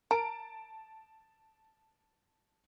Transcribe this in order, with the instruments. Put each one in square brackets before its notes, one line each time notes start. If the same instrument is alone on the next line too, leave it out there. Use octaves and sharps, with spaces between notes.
[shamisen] A#4 [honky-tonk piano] A5 D7